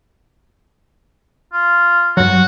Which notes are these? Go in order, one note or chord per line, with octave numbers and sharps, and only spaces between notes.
F4
G2 F#3 F#4